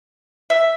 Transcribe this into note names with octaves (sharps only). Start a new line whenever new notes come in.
E5